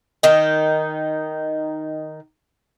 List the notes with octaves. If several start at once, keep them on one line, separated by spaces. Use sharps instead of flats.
D#3 D#4